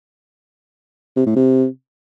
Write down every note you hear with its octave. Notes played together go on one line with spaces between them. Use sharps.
C3
A2
C3